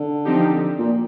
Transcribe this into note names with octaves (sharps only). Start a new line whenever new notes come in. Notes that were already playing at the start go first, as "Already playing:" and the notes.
Already playing: D3
F3 C4 D#4 G4
A#2